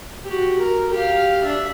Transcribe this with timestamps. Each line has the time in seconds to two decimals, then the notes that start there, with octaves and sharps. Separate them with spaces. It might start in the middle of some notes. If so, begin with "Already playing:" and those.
0.24 F#4 G4
0.59 A#4
0.91 G4 F5
1.43 D4 E5